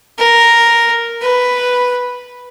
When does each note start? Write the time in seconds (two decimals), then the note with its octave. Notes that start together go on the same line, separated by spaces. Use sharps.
0.18 A#4
1.22 B4